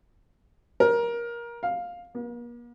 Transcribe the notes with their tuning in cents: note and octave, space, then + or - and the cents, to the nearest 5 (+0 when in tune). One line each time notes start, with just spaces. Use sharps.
A#4 +20
F5 +10
A#3 +45